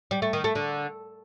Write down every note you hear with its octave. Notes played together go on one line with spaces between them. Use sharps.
G3
A3
D#3
A3
D3